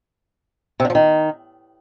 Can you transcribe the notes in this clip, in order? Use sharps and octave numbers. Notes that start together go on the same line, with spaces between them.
C3
D3
F3
D#3